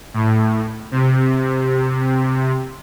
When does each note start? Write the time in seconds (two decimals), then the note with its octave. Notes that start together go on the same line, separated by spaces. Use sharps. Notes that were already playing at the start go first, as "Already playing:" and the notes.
0.14 A2
0.91 C3